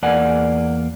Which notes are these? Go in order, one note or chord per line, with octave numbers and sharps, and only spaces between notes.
E2 A#3 D5 F#5 G#5